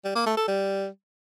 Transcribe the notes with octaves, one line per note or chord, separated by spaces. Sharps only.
G3
A#3
A3
A4
G3